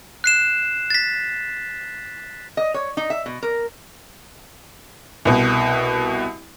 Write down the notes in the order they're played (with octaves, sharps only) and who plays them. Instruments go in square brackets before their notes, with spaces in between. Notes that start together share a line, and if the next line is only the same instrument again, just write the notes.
[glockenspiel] F#6 C7 E7
A6 B6
[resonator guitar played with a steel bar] D#5
C#5
D#4
E5
B2
A#4
[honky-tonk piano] C2 B2